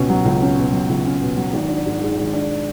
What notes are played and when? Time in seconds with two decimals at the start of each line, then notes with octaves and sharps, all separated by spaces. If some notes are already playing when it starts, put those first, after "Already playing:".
Already playing: C#2 B2 C#4
0.09 F#3
0.25 C#2
0.41 C#4
0.58 B2
0.72 F#3
0.89 C#2
1.06 C#4
1.21 B2
1.37 F#3
1.53 G#1
1.69 D4
1.85 G#2
2.02 G#3
2.17 G#1
2.33 D4